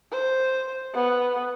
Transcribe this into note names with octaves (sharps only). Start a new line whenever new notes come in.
C5
B3